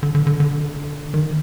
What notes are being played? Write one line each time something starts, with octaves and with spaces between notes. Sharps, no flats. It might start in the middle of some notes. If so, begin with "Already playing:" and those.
D3
D3
D3
D3
D#3